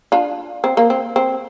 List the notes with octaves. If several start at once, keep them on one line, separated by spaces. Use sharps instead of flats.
D4 F4
C4
A#3
C4
C4